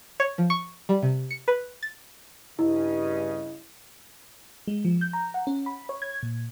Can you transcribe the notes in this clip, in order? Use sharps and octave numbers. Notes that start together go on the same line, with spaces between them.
C#5
F3
C#6
G3
C3
C#7
B4
A6
G2 C#3 E4 D#5
G#3
F3
G6
A#5
F#5
C#4
B5
C#5
G#6
A#2